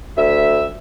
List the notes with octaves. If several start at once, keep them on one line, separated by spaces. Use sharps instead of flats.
D2 E5